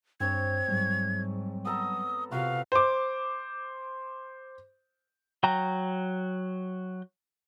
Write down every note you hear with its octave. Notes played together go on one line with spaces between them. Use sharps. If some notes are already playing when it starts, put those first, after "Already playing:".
G2 C4 C#5 A5 G#6
G#2 F#3 G3
B3 A4 A#5 D#6
C3 F4 F#4 B4 F5
C5 D6
F#3 G5 A#5